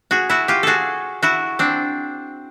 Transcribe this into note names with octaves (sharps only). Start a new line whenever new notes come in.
F#4 G#4
E4 F#4
F4 G4
F#4 G#4 A4
E4 F#4
C4 D4